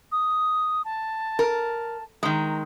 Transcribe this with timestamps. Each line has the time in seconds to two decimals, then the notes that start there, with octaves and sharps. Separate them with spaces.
0.12 D#6
0.85 A5
1.39 A#4
2.23 D#3 G#3 A#5